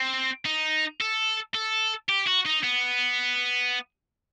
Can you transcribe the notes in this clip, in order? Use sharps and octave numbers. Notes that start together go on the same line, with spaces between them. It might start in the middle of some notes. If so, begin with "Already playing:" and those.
Already playing: C4
D#4
A4
A4
G4
F#4
D#4
B3